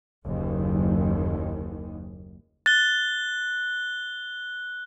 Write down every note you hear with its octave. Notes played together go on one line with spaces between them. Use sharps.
F#1 D#2 D#3
F#6 A6 G7